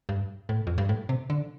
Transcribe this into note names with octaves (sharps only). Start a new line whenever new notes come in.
G2
A2
F2
G2
A2
C3
D3